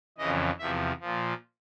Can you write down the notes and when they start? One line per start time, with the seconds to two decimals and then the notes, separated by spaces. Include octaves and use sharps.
0.18 F2 C#3 E3 D#5
0.58 E2 C3 F3 E5
1.01 A#2 F3